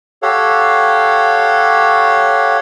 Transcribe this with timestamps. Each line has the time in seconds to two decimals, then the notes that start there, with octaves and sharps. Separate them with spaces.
0.22 G4 A4 C#5 F5 F#5